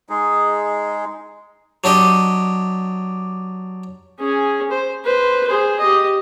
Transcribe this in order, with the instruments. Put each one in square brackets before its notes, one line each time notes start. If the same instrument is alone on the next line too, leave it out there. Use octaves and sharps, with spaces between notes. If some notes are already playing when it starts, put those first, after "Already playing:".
[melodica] G#3 D#4 G#4
[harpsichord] F#3 D4 G4 D#5
[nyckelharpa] C#4 G#4
C5
B4 C5
G#4 C5
G4 D#5